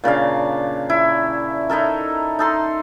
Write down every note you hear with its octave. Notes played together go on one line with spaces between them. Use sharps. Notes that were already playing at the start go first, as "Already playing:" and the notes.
A#2 C#3 D4 F5
E4
D#4 E4 A4 A#4
D#4 A4 C6